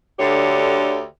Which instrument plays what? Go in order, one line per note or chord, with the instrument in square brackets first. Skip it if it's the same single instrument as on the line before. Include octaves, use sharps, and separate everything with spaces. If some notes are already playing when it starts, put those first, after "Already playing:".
[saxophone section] D2 D3 G4 C#5